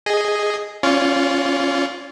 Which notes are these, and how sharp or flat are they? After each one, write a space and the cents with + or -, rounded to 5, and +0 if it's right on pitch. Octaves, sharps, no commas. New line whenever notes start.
G#4 +0 D#5 +0
C#4 -5 F4 +0 D5 -40